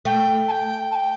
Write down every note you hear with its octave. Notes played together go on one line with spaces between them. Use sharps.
A3 G5
A5
G5
A5
G5